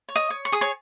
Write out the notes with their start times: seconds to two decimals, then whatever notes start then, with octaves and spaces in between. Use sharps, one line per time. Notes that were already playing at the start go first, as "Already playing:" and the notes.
0.09 C#5
0.16 D#5 D#6
0.30 C#5
0.45 C#6
0.52 G#4 D#6
0.61 C#5 C#6